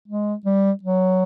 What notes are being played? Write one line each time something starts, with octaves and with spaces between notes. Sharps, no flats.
G#3
G3
F#3